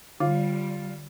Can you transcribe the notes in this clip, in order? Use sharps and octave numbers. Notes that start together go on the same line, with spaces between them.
D3 G3 F4